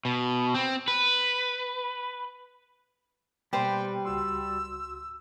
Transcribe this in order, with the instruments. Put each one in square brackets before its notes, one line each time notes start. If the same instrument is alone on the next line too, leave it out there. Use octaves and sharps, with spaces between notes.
[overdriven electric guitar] B2
C4
B4
[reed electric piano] B2 A#3 [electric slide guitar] G3 [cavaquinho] G4 B4 C5 [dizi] G5
[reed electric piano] C#2 F#4 C6 [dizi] E6